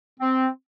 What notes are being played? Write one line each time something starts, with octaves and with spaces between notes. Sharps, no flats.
C4